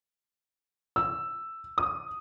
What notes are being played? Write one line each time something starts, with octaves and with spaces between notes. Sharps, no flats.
E6
D#6